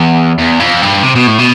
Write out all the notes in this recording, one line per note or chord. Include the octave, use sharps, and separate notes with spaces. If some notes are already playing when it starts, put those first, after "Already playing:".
Already playing: E2
E2
F2
G2
C3
B2
A2
B2